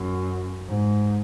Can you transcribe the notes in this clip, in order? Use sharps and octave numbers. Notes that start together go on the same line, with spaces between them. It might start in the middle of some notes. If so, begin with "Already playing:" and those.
Already playing: F#2
G#2